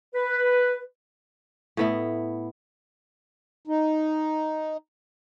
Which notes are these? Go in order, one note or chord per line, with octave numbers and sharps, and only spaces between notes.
B4
A2 B3 E4
D#4